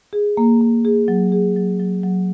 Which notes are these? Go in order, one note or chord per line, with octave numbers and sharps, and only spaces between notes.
G#4
A#3
A#3
G#4
F#3
G#4
F#3
F#3
F#3